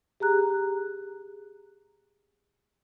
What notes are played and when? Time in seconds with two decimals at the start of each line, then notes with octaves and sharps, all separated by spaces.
0.20 G4 G#4 A#5 F#6